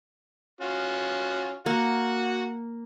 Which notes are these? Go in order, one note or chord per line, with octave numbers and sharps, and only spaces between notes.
C#4 F4 F#4
A#3 F#4 F#5